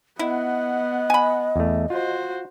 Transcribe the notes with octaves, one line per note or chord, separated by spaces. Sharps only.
B3 E4 D#5 F#5
G#5 B5
E2 A3
F4 F#4 C5